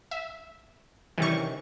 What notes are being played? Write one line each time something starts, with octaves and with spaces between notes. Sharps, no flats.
E5
C3 D#3 E3 G3 C#4 C#6